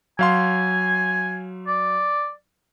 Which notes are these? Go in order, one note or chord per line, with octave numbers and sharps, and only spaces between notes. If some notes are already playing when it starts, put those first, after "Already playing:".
F#3 F5 G#5 C6
D5